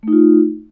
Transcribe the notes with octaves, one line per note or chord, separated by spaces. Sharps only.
A3 D#4 F4